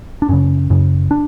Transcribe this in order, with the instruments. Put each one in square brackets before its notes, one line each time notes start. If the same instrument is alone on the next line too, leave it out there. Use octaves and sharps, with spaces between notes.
[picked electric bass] D4
F#2 C#3 C#4
F#2 C#3
D4